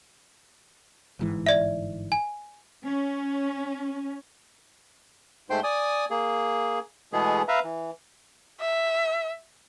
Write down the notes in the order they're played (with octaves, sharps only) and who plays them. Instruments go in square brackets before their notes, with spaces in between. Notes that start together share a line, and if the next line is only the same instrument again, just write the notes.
[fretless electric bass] G1 G#2 E3
[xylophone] D5 E5
G#5
[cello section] C#4
[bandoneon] G#2 A3 C5 G5 C6
D5 G#5 D#6
A#3 G#4
B2 E3 G#3 A3 B3 G#4
B4 E5 F5 A#5
E3
[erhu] E5